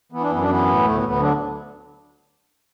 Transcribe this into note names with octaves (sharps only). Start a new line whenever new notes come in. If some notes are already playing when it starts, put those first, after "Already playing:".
E3 B3
D4
F#2 B3
D4
E3 B3
A2
D2 A3
B3
D2
B3
D3 F#3 D4